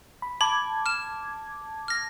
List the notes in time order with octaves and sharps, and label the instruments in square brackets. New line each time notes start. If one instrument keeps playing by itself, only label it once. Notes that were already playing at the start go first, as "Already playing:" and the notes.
[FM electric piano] B5
[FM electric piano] A5 D6 G#6 [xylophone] B5
[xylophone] F6 E7
F6 A#6